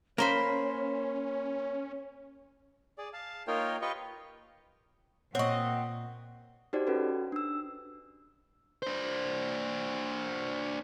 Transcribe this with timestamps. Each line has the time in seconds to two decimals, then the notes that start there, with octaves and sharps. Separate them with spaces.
0.18 A#3 C#4 A#4 C5 C#5 B5
2.97 G#4 D5
3.13 F5 A5
3.47 A#3 D#4 F4 A#4 C#5 G5
3.82 F4 G4 B4 D#5 G5 C#6
5.35 A#2 C4 C#5 D#5 F#5 C#6
6.73 D#4 F#4 G4 C5 D5
6.87 C#4 F#4 A4 B4
7.32 D4 E6
8.83 D4 C5